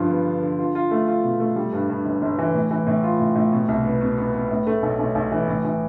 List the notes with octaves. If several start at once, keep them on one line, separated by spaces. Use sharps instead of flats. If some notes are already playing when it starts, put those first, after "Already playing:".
Already playing: G2 D3 F3 F4
B3
D3
D3
F4
F4
A3
F4
B2
A3
G3
G2
G2
G1
G1
E3
A2
E3
A2
F4
A2
A2
B2
C2
B3
B2
B3
B3
A2
A3
B1
B1
B1
E3
A2
E3